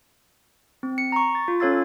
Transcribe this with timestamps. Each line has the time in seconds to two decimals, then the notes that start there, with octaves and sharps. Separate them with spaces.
0.83 C4
0.98 C#7
1.12 A#5 C#6
1.35 A6
1.48 F4
1.60 C#4 A4 C#5 F5 E6 A6